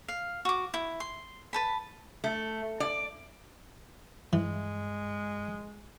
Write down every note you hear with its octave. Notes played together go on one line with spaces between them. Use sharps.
F5
F#4 D6
E4
C6
B4 A5 B5
A3
D5
G2 E3 G#3